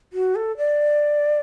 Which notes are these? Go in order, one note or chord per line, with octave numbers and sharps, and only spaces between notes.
F#4
A4
D5